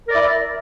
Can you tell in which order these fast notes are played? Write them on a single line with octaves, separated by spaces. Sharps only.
A#4 D5 E4